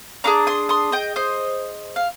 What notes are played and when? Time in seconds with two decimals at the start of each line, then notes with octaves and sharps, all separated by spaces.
0.24 D4 F4 G#4 A#5 D6
0.47 C6 D#6
0.69 C6 D#6
0.92 D#5 G5
1.16 C5 D#5
1.96 F5